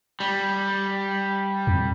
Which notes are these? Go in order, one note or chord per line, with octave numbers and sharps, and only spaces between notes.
G3
F2